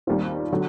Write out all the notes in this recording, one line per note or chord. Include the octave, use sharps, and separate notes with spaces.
D#2 D#3 G3 C4 F4
D3 F#3